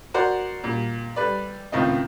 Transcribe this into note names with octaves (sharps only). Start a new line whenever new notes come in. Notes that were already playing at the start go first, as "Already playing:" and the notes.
F#4 A#4 C5 D5 F#5
A#2 G3
G3 A4 B4 D5
C#2 A2 D#3 C4 F4 D#5